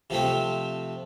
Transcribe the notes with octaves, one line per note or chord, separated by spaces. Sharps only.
C3 F3 A3 C4